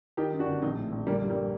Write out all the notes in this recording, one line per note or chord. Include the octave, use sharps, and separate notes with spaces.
D#3 D#4 G4
F#2
D4 F#4
G1
A#1 C4 D#4
A2
A#1
D3 G3 A#3
G2
G3 A#3